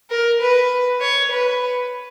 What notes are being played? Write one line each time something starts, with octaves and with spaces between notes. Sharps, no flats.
A#4
B4
C#5
B4